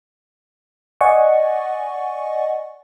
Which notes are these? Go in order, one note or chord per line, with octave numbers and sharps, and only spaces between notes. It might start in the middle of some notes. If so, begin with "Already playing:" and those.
D5 D#5 F#5 G#5 C#6